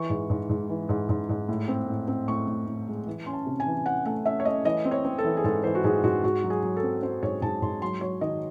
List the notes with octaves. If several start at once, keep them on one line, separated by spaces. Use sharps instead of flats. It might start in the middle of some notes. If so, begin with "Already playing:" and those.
Already playing: E3 C#6
G#2
G#2
G#2
E3
G#2
G#2
G#2
A2
C4
A2
C4
A2 C#6
A2
A2
G#3
E3
C#4 C6
A5
C3
G#5
E3
C#4 F#5
A3 F#5
C#4 E5
C#5
A3 D#5
E3 D#5
C4
C#5
C4
A4
E3
G#4
G#2 A4
E3 C5
F#4
G#2 G#4
G#2 F#4
G#2 F#4
F#3
G#4
F#3
A4
C4
C4 C5
G#2 C#5
G#2 A5
G#2 C6
F#3 C6
F#3 C#5
D#3 D#5